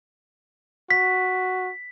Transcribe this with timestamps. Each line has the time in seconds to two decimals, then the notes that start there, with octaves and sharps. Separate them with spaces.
0.91 F#4 B6